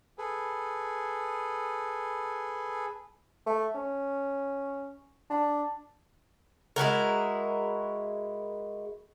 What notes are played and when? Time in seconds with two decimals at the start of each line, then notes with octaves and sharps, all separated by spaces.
0.18 G#4 A4 B4
3.46 A3
3.74 C#4
5.30 D4
6.76 G#3 E4 F#4 A#4